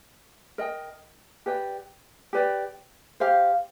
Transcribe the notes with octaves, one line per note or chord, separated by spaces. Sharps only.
A#4 D#5 G5
G4 B4 D5 G5
G4 B4 D5 G5
G4 C5 F5